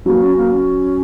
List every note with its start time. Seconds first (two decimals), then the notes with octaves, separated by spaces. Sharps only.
0.05 F#3 A#3
0.21 C#4
0.37 A#3
0.51 C#4